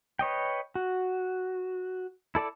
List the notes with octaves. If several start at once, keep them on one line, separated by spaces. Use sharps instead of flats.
B4 C#5 D#5 G5
F#4
E4 A4 D5 A5